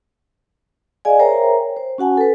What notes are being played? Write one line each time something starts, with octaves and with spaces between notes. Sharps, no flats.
G#4 D5 D#5 F5 G#5
A#4 C5 C#5 E5 G5 A#5
C5
C#4 F#4 F#5 G#5 A5
A4 B4